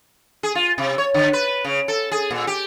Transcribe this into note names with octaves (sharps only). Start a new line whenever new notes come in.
G#4
F4
C3
C#5
D3
B4
C#3
A4
G#4
A#2
G4